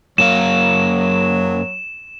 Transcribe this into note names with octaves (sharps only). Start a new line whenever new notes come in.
F#2 F#3 A#3 F5 E7